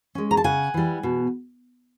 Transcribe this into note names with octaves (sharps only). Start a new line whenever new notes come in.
G#3 C#4
A#5
A5
C#3 F#5 G#5
E3 G3
B2